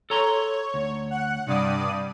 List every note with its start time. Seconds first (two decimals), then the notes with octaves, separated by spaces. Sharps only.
0.10 A4 C#5 A#5 C6
0.74 D2
1.11 F#5
1.47 G2 C3 D5 D#6